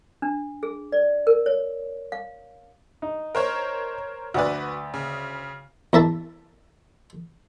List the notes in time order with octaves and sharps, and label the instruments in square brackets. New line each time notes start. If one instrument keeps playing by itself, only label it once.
[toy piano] D4
G#4
D5
A#4
C#5
F5
[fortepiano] D#4
[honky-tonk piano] A#4 C5 C#5
[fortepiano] D2 D5 [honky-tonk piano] F#4 B4
[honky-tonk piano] C#3
[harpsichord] E2 A#4 E5 A5